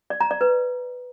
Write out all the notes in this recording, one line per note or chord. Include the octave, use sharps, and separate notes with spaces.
D5
A#5
D5
B4